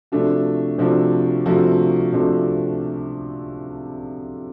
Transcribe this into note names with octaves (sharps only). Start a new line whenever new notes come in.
C3 F3 A3 D4 F#4
C3 F3 A3 D4 F#4
C3 F3 A3 D4 F#4
C3 F3 A3 D4 F#4